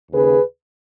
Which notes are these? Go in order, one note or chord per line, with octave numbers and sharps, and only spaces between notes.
D#2 C#3 G#4 B4